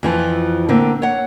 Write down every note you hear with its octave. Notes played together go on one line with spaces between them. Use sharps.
F2 E3 F3
D3 A3 A#3 C4
C#5 F#5